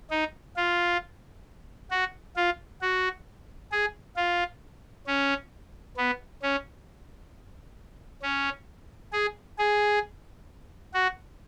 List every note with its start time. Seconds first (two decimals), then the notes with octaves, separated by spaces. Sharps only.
0.11 D#4
0.56 F4
1.91 F#4
2.36 F4
2.81 F#4
3.72 G#4
4.16 F4
5.07 C#4
5.97 B3
6.43 C#4
8.22 C#4
9.13 G#4
9.58 G#4
10.94 F#4